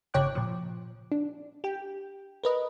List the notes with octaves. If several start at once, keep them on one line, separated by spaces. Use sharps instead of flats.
G1 C#3 C#5 G5 D6 F#6
A#2 F3
D4
G4 G5
A#4 B4 D#5